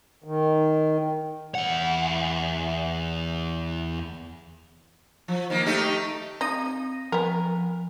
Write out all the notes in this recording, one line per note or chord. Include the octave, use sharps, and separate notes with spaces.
D#3
E2 F#5
F3
D#3 A#3
A3 D#4 G4
C4 D#4 A#6 D#7
F3 B3 A#4